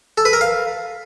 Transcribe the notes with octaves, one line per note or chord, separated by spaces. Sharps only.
A4
B4
A#4
F5